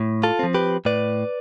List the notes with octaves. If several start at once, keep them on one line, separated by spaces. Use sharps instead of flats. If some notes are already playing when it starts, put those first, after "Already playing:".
Already playing: A2
F4 A4
F3 C4
G4 B4
A2 B4 D5